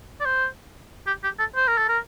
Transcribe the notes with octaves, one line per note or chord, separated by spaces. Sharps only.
D5
C5
G4
G4
A4
C5
A#4
A4
A#4